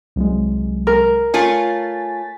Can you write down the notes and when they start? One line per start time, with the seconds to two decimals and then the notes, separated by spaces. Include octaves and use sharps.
0.16 C2 F#3 G#3
0.87 A#4
1.34 A3 F4 C#5 G#5 A6 B6